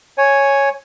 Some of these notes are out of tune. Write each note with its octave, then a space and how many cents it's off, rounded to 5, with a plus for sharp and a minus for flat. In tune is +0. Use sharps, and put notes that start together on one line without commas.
C#5 +0 G#5 +0